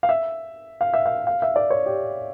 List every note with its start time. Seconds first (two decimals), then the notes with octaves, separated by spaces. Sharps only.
0.03 F5
0.09 E5
0.81 F5
0.94 E5
1.06 F5
1.27 F5
1.42 E5
1.56 D5
1.70 C#5
1.86 G4